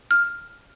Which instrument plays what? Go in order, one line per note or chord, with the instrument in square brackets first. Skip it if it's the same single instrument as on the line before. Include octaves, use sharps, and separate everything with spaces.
[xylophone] F6